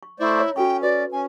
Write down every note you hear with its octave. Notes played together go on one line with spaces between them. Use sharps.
C#6
A3 E4 C5 D5
C#5 E5 A#5
C#4 F#4 A4 G5 C#6
F#4 B4 D5
C#4 G#5